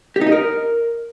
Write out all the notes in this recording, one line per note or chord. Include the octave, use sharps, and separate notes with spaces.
G4
D#4
D#5
A#4